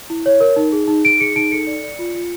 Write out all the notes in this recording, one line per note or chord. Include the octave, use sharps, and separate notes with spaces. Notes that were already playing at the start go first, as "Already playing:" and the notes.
E4
C#5
A#4
D#4
G#4
D#4
D#4 D7
G#4 C#7
D#4 D7
A4 C#7
D5
D5
F4
F4